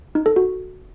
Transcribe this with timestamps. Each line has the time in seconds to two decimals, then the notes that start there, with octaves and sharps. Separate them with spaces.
0.15 D#4
0.26 A4
0.36 F#4